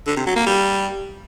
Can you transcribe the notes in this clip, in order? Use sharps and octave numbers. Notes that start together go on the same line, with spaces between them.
D3
C3
F#3
A#3
G3